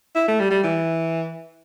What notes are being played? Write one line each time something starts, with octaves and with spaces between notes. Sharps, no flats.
E4
A3
G3
G3
E3